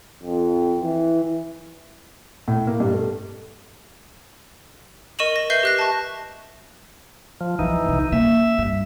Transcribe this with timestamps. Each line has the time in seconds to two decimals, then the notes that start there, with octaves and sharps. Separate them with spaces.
0.23 F2
0.81 E3
2.48 A2
2.67 A#3
2.80 G2
2.93 A3
5.19 A#4 D#5 C#6 D#7 E7 F#7
5.36 A#6
5.50 B4 E5 G6 C7 G7
5.63 G4 F#6 A#6
5.79 A5 C#6
7.41 F3
7.59 F#2 E3 F3 D#4
7.86 B1 C#3
8.12 A#3 C#4 E5
8.58 G2